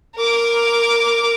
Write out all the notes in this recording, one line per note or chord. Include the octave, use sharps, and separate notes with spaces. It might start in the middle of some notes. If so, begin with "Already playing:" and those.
A#4 D6